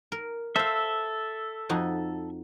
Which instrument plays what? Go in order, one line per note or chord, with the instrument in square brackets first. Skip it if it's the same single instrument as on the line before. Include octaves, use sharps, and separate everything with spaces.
[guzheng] A#4
[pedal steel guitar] A4 E5 [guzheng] C5 F5
[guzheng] F2 D#4 F#4